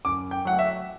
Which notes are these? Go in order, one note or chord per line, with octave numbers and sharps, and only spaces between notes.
F#2 D6
G5
F#3 A3 F#5
E5